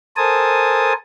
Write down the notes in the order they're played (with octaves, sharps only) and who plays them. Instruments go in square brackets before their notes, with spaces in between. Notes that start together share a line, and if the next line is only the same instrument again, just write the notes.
[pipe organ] A4 A#4 C5 G#5 A5 D#6